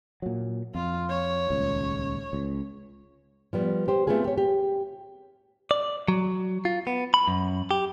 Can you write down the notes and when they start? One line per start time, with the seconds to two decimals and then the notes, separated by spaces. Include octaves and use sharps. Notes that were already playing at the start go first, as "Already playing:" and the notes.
0.22 A#2 F#3
0.75 F2 F4
1.10 C#5
1.50 D#1 C#2
2.33 C#2
3.53 F3 G3 B3
3.88 G4 C5
4.07 A3 B3 C4 F4 G#4
4.25 G4 C#5
4.38 G4
5.71 D5
6.08 F#3
6.65 F4
6.87 B3
7.14 B5
7.28 F#2
7.71 G4